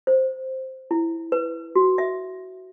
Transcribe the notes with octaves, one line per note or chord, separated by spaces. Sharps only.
C5
E4
B4
F#4
E5